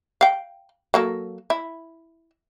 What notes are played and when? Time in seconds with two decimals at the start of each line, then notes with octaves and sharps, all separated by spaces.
0.21 F5 G5
0.94 F#3 A#3 A4
1.50 E4